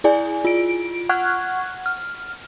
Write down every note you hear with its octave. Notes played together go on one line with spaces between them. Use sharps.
E4 G#4 D5 G#5
F4 D7
F#5 C#6 F6 F#6 G#6
F6